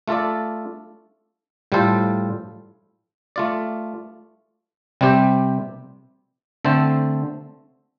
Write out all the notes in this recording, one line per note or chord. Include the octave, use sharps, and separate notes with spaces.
A3 F4 A4 D5
A2 G3 F4 A4 C5
A3 F4 D5
C3 G3 C4 G4
D3 A3 C4 A4 C5